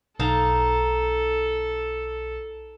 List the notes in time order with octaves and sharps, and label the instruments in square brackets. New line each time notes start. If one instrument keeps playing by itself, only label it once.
[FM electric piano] B1 [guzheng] D#4 F5 A5 [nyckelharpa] A4